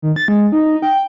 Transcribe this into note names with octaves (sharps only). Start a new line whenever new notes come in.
D#3
A6
G#3
D#4
G5